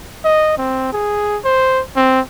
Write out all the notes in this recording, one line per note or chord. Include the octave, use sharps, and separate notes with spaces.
D#5
C4
G#4
C5
C4